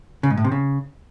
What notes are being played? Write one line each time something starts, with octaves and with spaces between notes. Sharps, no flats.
C#3
G#2
A2
C3
C#3